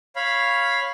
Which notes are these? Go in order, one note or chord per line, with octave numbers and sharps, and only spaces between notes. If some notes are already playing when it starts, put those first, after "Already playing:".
C#5 F5 B5